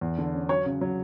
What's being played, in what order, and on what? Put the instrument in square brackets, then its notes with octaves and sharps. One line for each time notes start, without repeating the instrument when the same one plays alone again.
[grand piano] E2
D3
C#4
[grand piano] F#3 [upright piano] C#5
[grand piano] C#3
F#3